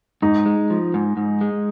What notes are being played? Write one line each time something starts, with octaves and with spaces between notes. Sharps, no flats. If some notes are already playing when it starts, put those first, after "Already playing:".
G#2 D#4
G#3
F3
G#2
G#2
G#3